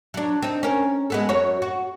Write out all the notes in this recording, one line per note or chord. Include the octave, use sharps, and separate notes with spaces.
F#3 D4
C4 D#4
C#4 A#4
G#3 B3 A4
F#2 F#4 C#5
F#4